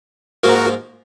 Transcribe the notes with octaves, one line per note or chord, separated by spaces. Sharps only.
G#2 F3 A#3 F#4 A#4